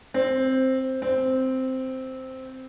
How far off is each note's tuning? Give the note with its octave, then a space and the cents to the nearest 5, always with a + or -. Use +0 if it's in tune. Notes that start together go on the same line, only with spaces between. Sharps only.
C4 +5
C4 -5